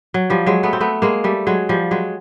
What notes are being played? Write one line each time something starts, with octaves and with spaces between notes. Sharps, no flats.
F#3
F3 G3
F#3 G#3
A3 B3
C4
A3 B3
G#3 A#3
G3 A3
F#3 G#3
F3 G3
F#3 G#3